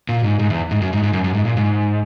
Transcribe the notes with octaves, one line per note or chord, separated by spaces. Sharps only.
A#2
G#2
G#2
E2
G#2
F#2
G#2
G#2
F#2
F#2
G#2
A#2
G#2